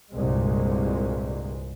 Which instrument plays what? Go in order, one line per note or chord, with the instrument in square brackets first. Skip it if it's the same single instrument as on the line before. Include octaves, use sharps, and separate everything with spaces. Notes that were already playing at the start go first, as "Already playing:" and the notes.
[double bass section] C2 G2 A#2 G#3